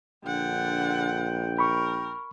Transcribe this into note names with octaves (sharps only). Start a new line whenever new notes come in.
A#1 D3 F#5 G5
A#4 B5 C#6